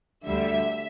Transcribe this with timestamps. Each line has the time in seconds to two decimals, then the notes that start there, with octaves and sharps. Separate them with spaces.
0.26 D2 D3 G3 E5